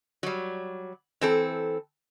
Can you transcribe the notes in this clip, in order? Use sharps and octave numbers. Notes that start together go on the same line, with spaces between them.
F#3 G3
E3 C4 A4